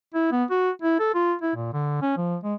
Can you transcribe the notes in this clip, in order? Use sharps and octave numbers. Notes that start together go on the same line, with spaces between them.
E4
B3
F#4
E4
A4
F4
E4
A#2
D3
C#4
F3
G#3